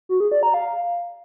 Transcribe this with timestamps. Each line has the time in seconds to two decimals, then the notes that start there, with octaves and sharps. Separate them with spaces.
0.09 F#4
0.20 G#4
0.32 D5
0.43 A#5
0.54 F5